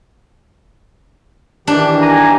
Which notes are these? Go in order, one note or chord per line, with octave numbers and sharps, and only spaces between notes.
D#3 E3 D4 G4
G#5 A#5